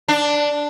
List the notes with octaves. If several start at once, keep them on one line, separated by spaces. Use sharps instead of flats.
D4